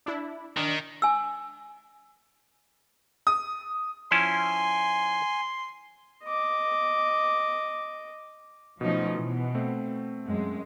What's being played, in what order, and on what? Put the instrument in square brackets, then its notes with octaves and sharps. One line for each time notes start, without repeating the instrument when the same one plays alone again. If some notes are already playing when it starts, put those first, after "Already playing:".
[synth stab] D4 E4
[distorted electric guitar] D#3 [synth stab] D4
[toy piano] G#5 E6
[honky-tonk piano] D#6
[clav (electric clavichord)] F3 C#4 E4 [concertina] G#5 [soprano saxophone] C6
[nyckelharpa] D#5 D6
[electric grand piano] B2 A3 [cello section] F3 C#4 D#4
[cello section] B2 [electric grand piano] E3
[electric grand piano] A3 C4
[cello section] F#2 G#3